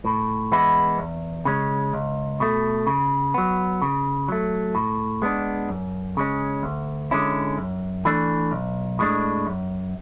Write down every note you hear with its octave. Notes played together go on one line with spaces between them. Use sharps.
A2
E3 G#3 B3 E4
E2
C#3 G#3 C#4
C#2
B2 A3
C#3
F#3 B3
C#3
F#3 A3
A2
G#3 B3 D4
F#2
C#3 G#3 C#4
D2
D3 G#3 C#4 E4
F#2
E3 A3 D4
B1
A2 G#3 D4
F#2